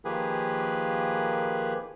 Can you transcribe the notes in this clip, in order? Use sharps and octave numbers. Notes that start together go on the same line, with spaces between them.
D#3 F3 A#3 G4 G#4 B4